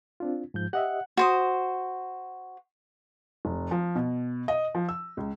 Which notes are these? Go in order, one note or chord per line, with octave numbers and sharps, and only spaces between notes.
C4 D4 F4
G#2 F3 G6
G4 D#5 E5 F#5
F#4 C5 D#6
F1
F3
B2
D#5
F3
E6
C#2